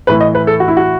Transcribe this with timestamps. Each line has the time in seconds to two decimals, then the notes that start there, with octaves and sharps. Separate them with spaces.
0.07 A2 E3 B4
0.21 D#5
0.35 B4
0.47 A4
0.60 F#4
0.68 E4
0.77 F#4